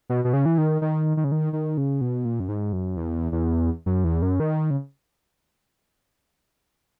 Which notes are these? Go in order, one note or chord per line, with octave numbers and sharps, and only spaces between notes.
B2
B2
C#3
E3
D#3
D#3
D#3
C#3
D#3
D#3
C#3
B2
A#2
F#2
G#2
F#2
E2
E2
F#2
E2
F#2
D#3
C#3